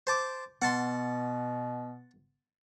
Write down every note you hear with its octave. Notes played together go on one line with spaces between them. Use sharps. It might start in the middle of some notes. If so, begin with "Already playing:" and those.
C5 A5 D6
B2 B3 F#5 A5 C6